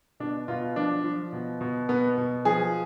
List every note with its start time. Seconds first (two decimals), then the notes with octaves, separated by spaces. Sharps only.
0.20 B2 D4
0.48 B2 F4
0.76 F3 D4
1.04 F3
1.33 B2
1.61 B2
1.89 B2 B3
2.18 B2
2.45 F3 G#4